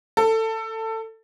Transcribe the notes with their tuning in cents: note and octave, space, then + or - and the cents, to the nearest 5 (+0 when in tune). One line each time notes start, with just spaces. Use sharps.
A4 +20